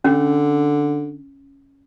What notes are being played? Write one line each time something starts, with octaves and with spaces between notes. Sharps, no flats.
D3 C#4